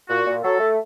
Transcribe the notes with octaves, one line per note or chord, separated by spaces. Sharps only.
A#2 F#4
A#2
F#3 A4
A3